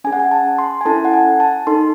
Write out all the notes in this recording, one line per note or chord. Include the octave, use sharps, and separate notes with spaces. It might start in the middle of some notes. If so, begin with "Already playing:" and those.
C#4 G#4 G#5
F#5
G#5
A5
C6
G#5
C#4 E4 A4 A5
F#5
G#5
A5
D#4 A4 C6